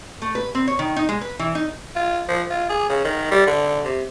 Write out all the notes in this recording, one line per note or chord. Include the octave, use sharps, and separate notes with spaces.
A3
B4
C4
C#5
D#3
D#4
G#3
B4
E3
D#4
F4
F3
F4
G#4
C#3
D#3
G3
D3
C3